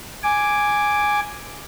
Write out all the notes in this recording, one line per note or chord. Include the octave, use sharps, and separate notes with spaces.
G#5 D6